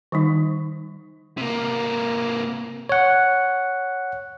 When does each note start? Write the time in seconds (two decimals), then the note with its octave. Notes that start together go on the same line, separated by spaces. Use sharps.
0.12 D#3 G3 D#4
1.37 C3 A#3
2.89 C#5 F#5